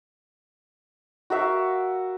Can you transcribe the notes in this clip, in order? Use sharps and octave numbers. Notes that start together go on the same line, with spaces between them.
F#4 A#4 E5 F5